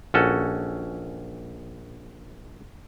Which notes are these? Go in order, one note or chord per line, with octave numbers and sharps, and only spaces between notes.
A#1 C#4 F#4 A4